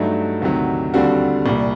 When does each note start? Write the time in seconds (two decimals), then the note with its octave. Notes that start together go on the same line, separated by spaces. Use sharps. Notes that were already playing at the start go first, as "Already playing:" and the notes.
Already playing: G2 F#3 A3 D#4
0.41 D2 C3 D#3 F#3
0.94 D#2 D3 G3 C4 F#4
1.46 C2 A#2 G3